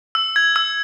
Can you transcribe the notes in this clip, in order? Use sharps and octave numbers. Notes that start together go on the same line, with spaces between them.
E6
G#6
E6